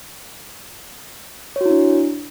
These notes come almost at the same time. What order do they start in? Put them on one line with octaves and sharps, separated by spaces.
C#5 F#4 E4 D4